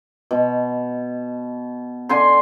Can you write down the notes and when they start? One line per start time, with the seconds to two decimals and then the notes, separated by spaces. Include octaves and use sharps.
0.31 B2
2.09 D3 G#5 C6